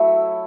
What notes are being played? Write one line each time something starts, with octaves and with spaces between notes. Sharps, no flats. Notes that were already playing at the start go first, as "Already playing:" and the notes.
Already playing: F#3 A3 E4 E5